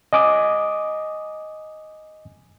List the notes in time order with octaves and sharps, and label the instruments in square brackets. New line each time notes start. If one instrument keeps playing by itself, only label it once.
[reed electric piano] D#5 G#5 D6 D#6